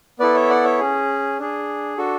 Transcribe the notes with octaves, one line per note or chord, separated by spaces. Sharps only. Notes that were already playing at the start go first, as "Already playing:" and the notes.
B3 E4 A4 B4 D5
C#5 E5
D5 F#5
C#5 E5
C#4 G#4
D4 G#4
D4 F#4 A4